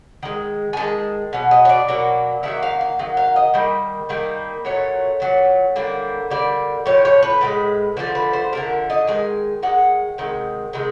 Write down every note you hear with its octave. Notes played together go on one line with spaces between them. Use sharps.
D#3 G#3
G#5
D#3 G#3 A5
B2 F#3
D#5
C#5
D5
B2 F#3 A#3
D#3 F#3 A#3 E5
F5
F5
D#3 F#3
F5
D#5
D#3 G3 A#3
D#3 G3 A#3
A#2 F#3 A3 C#5
A#2 F#3 A3
D3 G3 A#3
D3 G3 A#3 D5
A2 F3 C#5
C#5
B4
A2 F3 G#3
D3 F3 A3 C5
B4
C5
D3 F3 A3 A#4
D#5
D#3 G#3 G#5
D#3 G#3 F#5
C3 D#3 G#3
C3 D#3 G#3